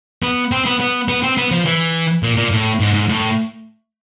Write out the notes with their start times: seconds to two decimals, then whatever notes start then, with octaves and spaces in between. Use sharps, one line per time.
0.23 B3
0.52 C4
0.66 B3
0.80 B3
1.08 B3
1.23 C4
1.37 B3
1.51 F3
1.65 E3
2.23 A#2
2.37 A#2
2.51 A2
2.80 G#2
2.94 G#2
3.09 A2